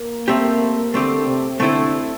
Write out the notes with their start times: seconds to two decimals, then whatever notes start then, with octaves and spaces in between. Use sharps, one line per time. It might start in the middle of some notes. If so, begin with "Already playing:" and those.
Already playing: A#3
0.28 A3 C4 G4
0.94 D3 A3 C4 G4
1.27 C3
1.60 D3 A3 C4 E4 A4